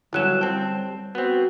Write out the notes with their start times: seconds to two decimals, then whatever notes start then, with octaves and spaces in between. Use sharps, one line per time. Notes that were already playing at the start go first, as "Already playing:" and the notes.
0.13 G1 F#3 G3 C#4 E4 F#6 E7
0.41 C4 G5 A5
1.15 B3 C4 F#4